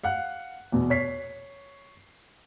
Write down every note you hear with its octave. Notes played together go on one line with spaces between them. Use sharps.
F5 F#5 F#6
E2 B2
C#5 B6 C7